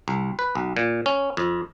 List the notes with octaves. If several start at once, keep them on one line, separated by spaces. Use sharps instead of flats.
C2
B4
B1
A#2
C#4
F2